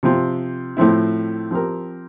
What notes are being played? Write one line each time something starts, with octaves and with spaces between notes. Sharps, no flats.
C3 F3 C4 F4
A2 F3 C4 E4
F3 C4 G4 A#4